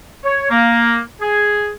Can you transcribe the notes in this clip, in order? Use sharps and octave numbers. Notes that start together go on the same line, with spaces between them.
C#5
A#3
G#4